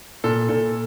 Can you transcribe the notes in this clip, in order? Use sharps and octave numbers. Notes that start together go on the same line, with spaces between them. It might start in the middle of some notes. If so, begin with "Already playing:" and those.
A#2 A4
A#2 A4